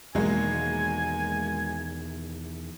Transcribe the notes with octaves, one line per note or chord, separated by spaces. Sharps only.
E2 B2 D#3 F#3 G#3 A#3 G#5